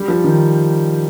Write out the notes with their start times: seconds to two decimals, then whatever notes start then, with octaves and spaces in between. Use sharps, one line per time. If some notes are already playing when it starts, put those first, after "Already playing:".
Already playing: G3
0.08 F3
0.24 D#3